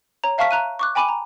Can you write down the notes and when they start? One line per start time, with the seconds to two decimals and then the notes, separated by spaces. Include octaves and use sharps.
0.24 C#5 A#5
0.38 E5 F5 A5 C#6 F6 B6
0.51 A#5 F#6 D#7
0.79 C#6 D6 F#6
0.95 G5 G#5 B5 D6 D#7
1.09 A#5